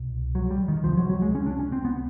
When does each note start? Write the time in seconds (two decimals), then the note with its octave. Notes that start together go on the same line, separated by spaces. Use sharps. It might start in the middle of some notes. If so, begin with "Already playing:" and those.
Already playing: C2 B2
0.35 F#3
0.51 G3
0.68 D#3
0.84 C#2 C3 F3
0.97 F#3
1.09 F#3
1.22 G#3
1.35 C#4
1.46 D4
1.59 C#4
1.72 C4
1.85 B3